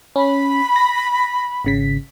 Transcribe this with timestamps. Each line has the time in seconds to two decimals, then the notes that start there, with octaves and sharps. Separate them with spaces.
0.16 C#4 B5
0.76 A#6
1.65 G#1 C#3 B6